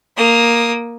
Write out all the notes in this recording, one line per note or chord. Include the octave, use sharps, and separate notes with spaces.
A#3 D#6